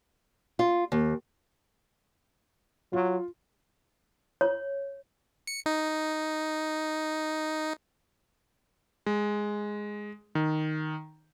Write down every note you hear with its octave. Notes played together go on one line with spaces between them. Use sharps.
F4
D#2
F#3 F4
C#5
C#7
D#4
G#3
D#3